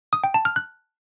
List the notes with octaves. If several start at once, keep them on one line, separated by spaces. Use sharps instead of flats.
D#6
G5
A5
F6
F#6